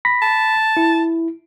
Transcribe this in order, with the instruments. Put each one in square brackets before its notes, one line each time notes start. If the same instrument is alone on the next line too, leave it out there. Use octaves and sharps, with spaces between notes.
[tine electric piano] B5 A#6 B6
[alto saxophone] A5
[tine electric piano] E4